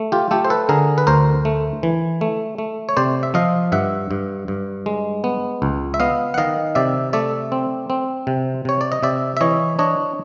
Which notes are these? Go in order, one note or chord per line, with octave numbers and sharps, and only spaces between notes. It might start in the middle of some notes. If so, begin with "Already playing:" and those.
Already playing: A3
F4 G4
A3 G4 A4
C5
A4 B4
D3 G#4 A#4
B4
D2 A#4 C5
A3
E3
A3
A3
C#5
C3 C5 D5
E5
F3 D#5 F5
G2 E5 F#5
G2
G2
G#3
B3
C#2
E5
B3 D#5 F5
F#5
D#3 D#5 F5
C3 D5 E5
A3 D5 E5
C4
C4
C3
C3 C#5
D5
D#5
C3 D5 E5
E5
E3 C#5 D#5
D4 C#5 D#5